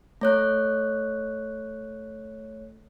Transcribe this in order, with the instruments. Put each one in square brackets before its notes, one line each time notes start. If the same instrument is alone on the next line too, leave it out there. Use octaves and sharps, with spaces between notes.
[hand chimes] A3 C#5 F#6